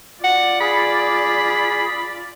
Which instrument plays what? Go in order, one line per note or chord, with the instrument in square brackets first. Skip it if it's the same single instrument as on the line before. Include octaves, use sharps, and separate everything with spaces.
[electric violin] F4 D5 [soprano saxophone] F#5
[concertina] G#4 [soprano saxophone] B5